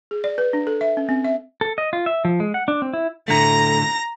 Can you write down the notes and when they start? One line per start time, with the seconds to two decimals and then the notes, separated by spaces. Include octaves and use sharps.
0.11 G#4
0.24 D5
0.38 B4
0.53 D4
0.67 A4
0.81 E5
0.97 C#4
1.09 C4
1.24 E5
1.61 A4
1.78 D#5
1.93 F4
2.06 E5
2.25 F3
2.40 G#3
2.54 F#5
2.68 D4
2.82 C4
2.93 E4
3.28 A2 D3 A3 A#5 A#6